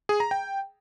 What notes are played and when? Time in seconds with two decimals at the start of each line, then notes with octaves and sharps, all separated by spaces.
0.09 G#4
0.20 A#5
0.31 G5